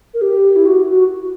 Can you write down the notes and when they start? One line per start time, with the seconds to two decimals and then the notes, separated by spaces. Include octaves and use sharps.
0.14 A#4
0.21 G4
0.56 E4
0.66 F#4
0.89 F#4